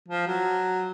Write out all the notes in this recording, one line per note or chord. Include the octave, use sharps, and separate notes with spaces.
F3
F#3